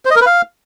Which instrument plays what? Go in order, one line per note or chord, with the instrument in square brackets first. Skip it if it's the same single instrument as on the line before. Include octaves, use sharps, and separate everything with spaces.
[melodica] C5
D#5
A#4
B4
F5